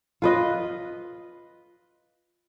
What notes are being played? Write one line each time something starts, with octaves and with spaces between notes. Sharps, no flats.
F4 B4 D#5